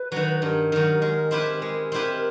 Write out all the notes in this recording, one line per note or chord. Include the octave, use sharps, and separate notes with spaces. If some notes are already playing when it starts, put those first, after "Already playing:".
Already playing: B4
D#3 F#3
G2 A#4
D#3 F#3
G#3
C4 E4 G4 B4
G#3 A#4
C4 E4 G4 B4